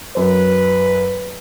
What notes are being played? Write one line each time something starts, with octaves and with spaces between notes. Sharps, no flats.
F#2 B4